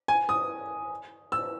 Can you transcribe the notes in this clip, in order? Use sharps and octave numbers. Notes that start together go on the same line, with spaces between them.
G#5
D#6
E6